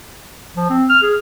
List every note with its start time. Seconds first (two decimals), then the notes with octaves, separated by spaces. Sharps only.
0.57 F3
0.70 C4
0.90 F6
1.03 G#4